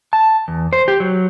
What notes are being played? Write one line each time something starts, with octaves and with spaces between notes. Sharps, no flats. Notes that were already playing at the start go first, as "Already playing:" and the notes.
A5
E2
C5
G4
F#3